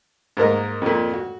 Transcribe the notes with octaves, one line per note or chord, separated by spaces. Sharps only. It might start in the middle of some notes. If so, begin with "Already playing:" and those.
G#2 A#3 A#4 D#5
F2 A#2
F#4